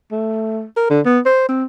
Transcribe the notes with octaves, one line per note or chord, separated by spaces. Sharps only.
A3
A#4
D3
B3
C5
C4